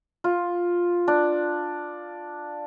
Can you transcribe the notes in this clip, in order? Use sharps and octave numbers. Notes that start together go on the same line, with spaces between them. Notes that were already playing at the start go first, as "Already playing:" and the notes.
F4
D4